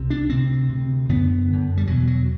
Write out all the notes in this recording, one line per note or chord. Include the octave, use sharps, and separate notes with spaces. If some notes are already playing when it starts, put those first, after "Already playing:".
Already playing: C2 C3
D4
D2 C3 C4
D2 C3
F#2 D3 B3
F#2 D3
G3
E2 B2 F#3
F#3